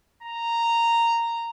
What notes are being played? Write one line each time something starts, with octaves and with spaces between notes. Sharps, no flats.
A#5